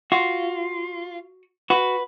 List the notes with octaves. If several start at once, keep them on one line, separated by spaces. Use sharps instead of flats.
F4 F#4
F#4 B4